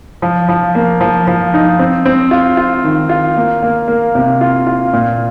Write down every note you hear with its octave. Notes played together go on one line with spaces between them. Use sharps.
F3
F3
A#3
F3
F3
D#4
C4
C4
F4
F4
D#3
F4
A#3
A#3
A#3
C3
F4
F4
A#2